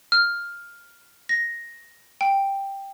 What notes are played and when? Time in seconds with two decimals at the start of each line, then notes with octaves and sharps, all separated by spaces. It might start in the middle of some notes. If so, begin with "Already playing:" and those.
0.12 F6
1.29 A#6
2.21 G5